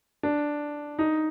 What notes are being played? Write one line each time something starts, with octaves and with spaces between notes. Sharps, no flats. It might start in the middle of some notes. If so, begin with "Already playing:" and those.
D4
D#4